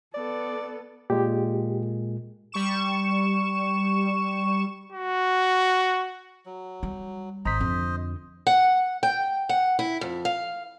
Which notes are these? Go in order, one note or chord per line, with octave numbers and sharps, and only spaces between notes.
B3 A4 D5
A#2 G#3 G4
G3 C#6 E7
F#4
F#3
G3
G#1 C5 D#5 A#5 B6
F2 D3
F#5
G5
F#5
E4
F2
F5